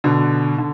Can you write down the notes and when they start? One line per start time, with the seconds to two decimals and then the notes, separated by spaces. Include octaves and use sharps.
0.04 B2 D3
0.58 D3